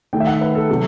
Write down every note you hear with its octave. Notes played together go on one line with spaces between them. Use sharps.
D#3 A3 G5
E5
F#5
B4
A4
C3 F#3